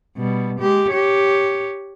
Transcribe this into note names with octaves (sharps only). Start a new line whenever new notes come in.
B2 G3
G#3 G4
G4 C#5